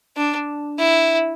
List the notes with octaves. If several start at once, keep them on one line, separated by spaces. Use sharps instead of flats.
D4
E4